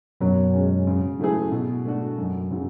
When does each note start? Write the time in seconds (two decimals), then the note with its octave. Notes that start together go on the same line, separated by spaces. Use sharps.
0.20 F#2 B2 F#3
0.53 G#3 C#4
0.87 C#3
1.19 F#3 A3 E4 G#4
1.52 B2
1.85 A3 D4 F#4
2.18 F#2
2.51 C#3 F#3